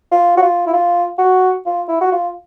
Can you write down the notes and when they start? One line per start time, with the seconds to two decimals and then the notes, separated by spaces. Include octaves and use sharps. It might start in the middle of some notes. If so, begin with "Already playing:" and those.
0.11 F4
0.37 F#4
0.42 F4
0.67 E4
0.73 F4
1.18 F#4
1.66 F4
1.88 E4
2.01 F#4
2.12 F4